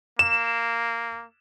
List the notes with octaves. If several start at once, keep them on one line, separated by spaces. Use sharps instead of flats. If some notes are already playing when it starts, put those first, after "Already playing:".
A#3 E7